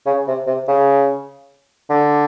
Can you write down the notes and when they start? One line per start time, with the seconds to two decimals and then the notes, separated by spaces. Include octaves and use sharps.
0.06 C#3
0.27 C3
0.47 C3
0.68 C#3
1.89 D3